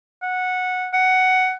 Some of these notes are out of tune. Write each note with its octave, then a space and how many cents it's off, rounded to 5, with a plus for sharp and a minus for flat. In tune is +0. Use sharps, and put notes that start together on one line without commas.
F#5 -10
F#5 +10